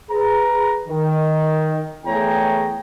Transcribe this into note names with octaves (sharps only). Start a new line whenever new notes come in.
G#4 B4 A#5
D#3
E2 A3 G#4 C#5 G5 A#5